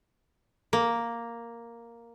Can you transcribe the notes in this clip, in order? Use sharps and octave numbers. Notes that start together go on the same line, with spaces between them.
A#3